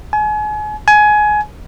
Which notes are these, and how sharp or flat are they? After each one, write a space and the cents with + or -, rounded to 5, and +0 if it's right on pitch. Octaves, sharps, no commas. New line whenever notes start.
G#5 +35
G#5 +20